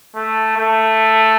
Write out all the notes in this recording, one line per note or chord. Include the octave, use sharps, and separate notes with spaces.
A3
A3